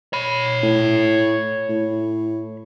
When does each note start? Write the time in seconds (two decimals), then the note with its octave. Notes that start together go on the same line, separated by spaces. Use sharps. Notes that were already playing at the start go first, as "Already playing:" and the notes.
0.13 C#5 B5
0.63 A2
1.69 A2